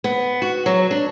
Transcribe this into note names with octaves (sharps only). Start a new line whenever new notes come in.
B3
F#4
F#3
D4